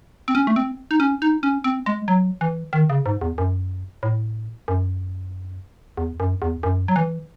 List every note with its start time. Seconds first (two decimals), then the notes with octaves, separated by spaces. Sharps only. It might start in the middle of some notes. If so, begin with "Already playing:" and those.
0.28 C4
0.35 C#4
0.47 A3
0.56 C4
0.91 D#4
1.00 C#4
1.22 D#4
1.43 C#4
1.64 C4
1.86 G#3
2.08 F#3
2.41 E3
2.73 D#3
2.90 C#3
3.06 G#2
3.21 E2
3.38 F#2
4.03 A2
4.68 F#2
5.97 E2
6.20 F#2
6.42 E2
6.63 F#2
6.88 F#3
6.96 E3